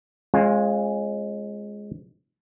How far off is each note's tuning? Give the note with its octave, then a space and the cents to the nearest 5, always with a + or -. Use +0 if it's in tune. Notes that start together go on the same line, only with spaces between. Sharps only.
G#3 +0 C#4 -40 F4 +0